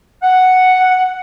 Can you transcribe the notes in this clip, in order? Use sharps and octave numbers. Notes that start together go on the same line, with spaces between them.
F#5